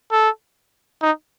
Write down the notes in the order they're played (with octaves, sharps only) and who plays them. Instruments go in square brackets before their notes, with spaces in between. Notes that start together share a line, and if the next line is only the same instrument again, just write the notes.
[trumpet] A4
D#4